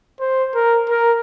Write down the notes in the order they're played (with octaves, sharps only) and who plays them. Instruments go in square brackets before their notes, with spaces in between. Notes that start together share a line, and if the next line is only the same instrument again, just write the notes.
[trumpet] C5
A#4
A#4